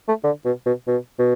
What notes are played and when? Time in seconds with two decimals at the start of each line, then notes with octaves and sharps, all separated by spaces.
0.08 A3
0.24 D3
0.45 B2
0.66 B2
0.87 B2
1.19 B2